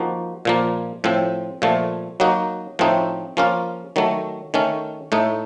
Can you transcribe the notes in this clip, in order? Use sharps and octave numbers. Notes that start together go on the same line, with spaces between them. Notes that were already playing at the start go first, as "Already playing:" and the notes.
Already playing: F3 A#3 D#4 F#4
A#2 F3 A#3
A2 F3 C4
A#2 F3 A3
F#3 A#3 D#4 F#4
A2 F3 A3 C4 D#4
F3 A#3 C#4 F4
D#3 F#3 A3
D#3 A3 C#4
A2 A3 D#4